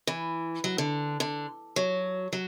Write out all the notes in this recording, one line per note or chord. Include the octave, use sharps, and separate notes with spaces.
E3
F#3
D3
D3
F#3
F#3